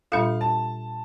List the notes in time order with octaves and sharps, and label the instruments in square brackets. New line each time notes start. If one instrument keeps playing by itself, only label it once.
[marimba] A#2 G3 D4 F4 A4 [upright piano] F5
[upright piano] A5